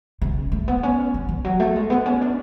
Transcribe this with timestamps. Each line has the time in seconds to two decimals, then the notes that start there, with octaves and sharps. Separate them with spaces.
0.22 C#3
0.52 A3
0.68 B3
0.83 C#4
1.14 C#4
1.29 E3
1.44 F#3
1.60 A3
1.76 G#3
1.90 B3
2.06 C#4
2.21 D4